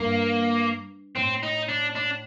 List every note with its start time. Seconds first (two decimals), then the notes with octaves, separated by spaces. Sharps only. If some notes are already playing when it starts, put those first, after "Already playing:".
Already playing: G2 A#3
1.16 A2 C4
1.43 D#4
1.69 D4
1.95 D4